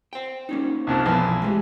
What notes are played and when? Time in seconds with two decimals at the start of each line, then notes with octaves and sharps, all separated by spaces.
0.13 C5 G5
0.49 A#3 C#4 D#4
0.87 C2 F2 F3
1.05 B1 E3 F3 B3 D#5
1.42 G#3 A3 G4